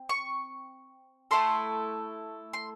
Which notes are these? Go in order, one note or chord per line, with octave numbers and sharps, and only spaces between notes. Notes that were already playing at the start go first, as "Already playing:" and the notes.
Already playing: C4
C#6
A3 C4 E4 A4 C6
C6